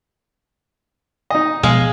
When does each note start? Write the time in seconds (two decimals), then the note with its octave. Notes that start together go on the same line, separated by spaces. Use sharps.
1.30 D#4 D#5
1.63 B2 F3 G#3 B3 G#4 F5